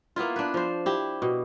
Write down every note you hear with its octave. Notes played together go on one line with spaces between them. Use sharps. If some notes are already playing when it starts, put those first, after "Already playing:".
A#3 B3 E4 F4
D4 B4
F3 C5
E4 G4
B2